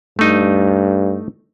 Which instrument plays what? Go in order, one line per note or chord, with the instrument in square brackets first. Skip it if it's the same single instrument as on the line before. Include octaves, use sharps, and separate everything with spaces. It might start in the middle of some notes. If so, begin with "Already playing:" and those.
[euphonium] G2 [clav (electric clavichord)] A3 D#4